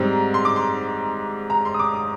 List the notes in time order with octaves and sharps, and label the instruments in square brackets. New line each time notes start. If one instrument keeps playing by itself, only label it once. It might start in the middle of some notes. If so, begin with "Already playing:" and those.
Already playing: [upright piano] G#2 G3 C4 A#5
C6
D6
C6
A#5
C6
D#6
D6
D#6